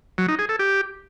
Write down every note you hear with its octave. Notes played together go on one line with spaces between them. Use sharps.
F#3
D#4
G#4
A4
G4